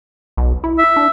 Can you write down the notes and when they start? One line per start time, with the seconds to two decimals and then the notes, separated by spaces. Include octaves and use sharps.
0.37 B1
0.64 E4
0.78 E5
0.96 D4